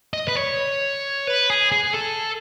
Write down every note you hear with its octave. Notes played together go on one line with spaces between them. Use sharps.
D#5
B4
C#5
B4
G#4
G#4
A4